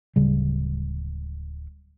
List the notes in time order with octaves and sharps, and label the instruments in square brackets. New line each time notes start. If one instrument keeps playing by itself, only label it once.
[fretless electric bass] D1 C#3 G3